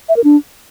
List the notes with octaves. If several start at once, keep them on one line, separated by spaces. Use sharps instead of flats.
E5
A#4
D4